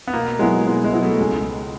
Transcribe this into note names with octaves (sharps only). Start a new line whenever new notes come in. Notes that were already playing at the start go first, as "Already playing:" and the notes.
B3
B2 A#3
F#3 G#3 B3 E4
B2 G#3
G#3
F#3 B3 E4
A3
C#2 G#3